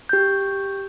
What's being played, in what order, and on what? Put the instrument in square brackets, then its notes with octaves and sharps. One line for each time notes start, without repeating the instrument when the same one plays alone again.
[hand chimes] G4 G6